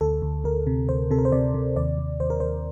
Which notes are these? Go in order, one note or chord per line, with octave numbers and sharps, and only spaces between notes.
D2 A4
D2
D2 A#4
C3
D2 C5
C3 A4
A#4
C5
C3 D5
C3
D#2 D5
D#2
D#2 C5
A#4
D#2 C5